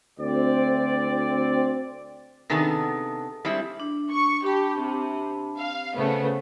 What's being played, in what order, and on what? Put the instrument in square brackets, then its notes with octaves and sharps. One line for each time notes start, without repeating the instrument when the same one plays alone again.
[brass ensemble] D2 C4 D5
[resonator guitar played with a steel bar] C3 D#3 B3 D4 G#4 A4
G3 G#3 C4 E4
[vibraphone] D4
[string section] C#6
[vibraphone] D4 A5 B5 [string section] G4
[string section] C3
F5
[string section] C#3 A3 B3 [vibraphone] C5